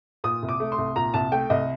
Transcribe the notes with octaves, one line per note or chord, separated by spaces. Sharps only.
A#2 D#6
C2
D6
A3
C6
C2
A#2 A#5
C2 A5
A3 G5
C2 D#5